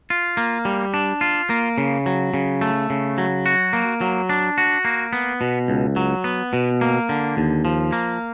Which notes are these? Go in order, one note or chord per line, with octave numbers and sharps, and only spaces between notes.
F4
A#3
G3
D4
F4
A#3
C#3
F#3
C#3
A3
C#3
F#3
F#4
A#3
F#3
D4
F#4
A#3
B3
B2
C#2
F#3
B3
B2
A#3
D3
D#2
F3
A#3